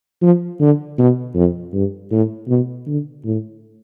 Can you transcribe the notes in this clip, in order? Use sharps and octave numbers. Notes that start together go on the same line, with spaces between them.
F3
D3
B2
F2
G2
A2
B2
D3
A2